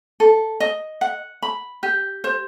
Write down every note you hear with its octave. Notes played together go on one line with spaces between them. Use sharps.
A4
D#5
F#5
B5
G4
C5